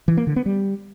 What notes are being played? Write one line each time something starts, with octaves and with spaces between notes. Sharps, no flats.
E3
A#3
D3
B3
G3